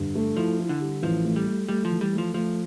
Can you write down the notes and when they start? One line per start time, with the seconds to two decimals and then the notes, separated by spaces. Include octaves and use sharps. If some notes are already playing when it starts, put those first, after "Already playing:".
Already playing: G2 D3
0.15 A3
0.37 F3 E4
0.59 E4
0.69 D3
0.80 G3
1.03 A1 F3
1.25 A3
1.36 G3
1.47 A3
1.68 G3 A3
1.85 F3
1.90 E3
2.01 G3
2.13 A3
2.18 F3
2.34 F3 A3